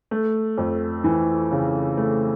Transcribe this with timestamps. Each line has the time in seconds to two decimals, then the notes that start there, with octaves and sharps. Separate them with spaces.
0.11 A3
0.58 F2
1.04 E3
1.51 C#3
1.97 A3